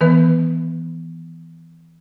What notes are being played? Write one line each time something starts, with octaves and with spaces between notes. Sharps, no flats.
D#3 E3 B3 B4